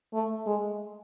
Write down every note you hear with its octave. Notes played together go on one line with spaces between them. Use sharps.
A3
G#3